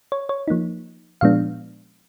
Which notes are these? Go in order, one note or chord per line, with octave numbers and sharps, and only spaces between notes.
C#5
C#5
F3 A#3 D#4
A#2 F3 G#3 B3 D4 F5